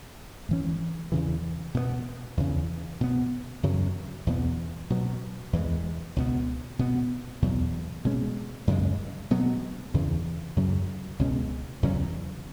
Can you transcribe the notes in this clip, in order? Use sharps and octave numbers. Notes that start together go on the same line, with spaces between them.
G#2 E3 C#4
E2 C#3 E3
B2 G#3 B3
E2 C#3 E3
B2 B3
F#2 C#3 F#3
E2 B2 B3
B2 F#3 B3
E2 E3 G#3
C#2 B2 B3
B2 B3
E2 B2 F#3
B2 G#3 C#4
F#2 C#3 G#3
B2 F#3 B3
E2 C#3 E3
F#2 C#3 F#3
C#2 B2 G#3 C#4
E2 C#3 F#3 C#4